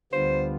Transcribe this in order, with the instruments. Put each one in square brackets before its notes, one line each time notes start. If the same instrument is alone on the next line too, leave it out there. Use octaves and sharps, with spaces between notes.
[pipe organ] D2 D3 G3 B3 F4 [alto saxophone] C5